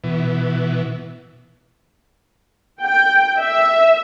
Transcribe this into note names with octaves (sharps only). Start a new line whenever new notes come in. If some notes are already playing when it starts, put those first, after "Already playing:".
B2 E3
G5
E5